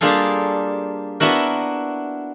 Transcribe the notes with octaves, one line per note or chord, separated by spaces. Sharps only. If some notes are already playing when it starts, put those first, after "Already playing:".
G3 A#3 D4 F4 G#4 A4
B3 D4 E4 F#4 A#4